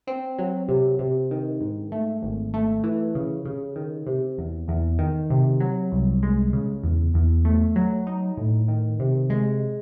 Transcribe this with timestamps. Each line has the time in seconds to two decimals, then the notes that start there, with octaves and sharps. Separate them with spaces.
0.07 C4
0.39 F#3
0.69 C3
0.99 C3
1.31 D#3
1.61 G#2
1.92 A3
2.22 G#1
2.54 A3
2.83 E3
3.15 C#3
3.45 C#3
3.76 D#3
4.06 C3
4.38 E2
4.68 E2
4.99 D#3
5.30 C3
5.60 F#3
5.92 C2
6.23 G#3
6.53 C#3
6.83 E2
7.14 E2
7.45 A3
7.76 F#3
8.07 D#4
8.37 A2
8.68 D#3
8.99 C3
9.30 G#3